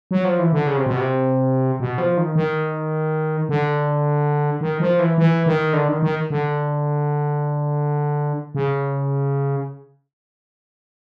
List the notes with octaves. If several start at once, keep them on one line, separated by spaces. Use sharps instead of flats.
F#3
F3
E3
D3
C#3
C3
B2
C3
B2
F3
D#3
D#3
D3
D#3
F3
E3
E3
D#3
D3
D#3
D#3
D3
C#3